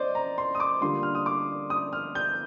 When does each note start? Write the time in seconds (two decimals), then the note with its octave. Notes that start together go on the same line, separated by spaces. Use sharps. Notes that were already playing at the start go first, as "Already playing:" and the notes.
Already playing: C5 D5 D#5
0.15 A#5
0.38 C6
0.55 D#6
0.60 D6
0.81 D3 G3 A#3 D4 F4 C6
1.03 F6
1.15 D#6
1.26 D6
1.70 D#6
1.93 F6
2.15 G6